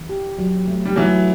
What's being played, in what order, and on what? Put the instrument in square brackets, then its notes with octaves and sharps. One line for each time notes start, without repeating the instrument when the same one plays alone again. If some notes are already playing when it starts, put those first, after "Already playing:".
Already playing: [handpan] E3
G4
F#3
A3
[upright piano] G3
[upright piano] E3 F#3 [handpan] A3